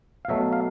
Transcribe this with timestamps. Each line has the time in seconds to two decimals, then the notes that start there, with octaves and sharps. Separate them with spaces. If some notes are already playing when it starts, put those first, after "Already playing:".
0.25 F5
0.28 B2 F#3 A3 E5
0.53 F5